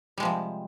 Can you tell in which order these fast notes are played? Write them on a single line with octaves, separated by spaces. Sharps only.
G3 G#3 F3 C3